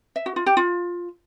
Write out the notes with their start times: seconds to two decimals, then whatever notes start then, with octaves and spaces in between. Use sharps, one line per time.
0.16 E5
0.26 F#4
0.36 F4
0.46 G4
0.57 F4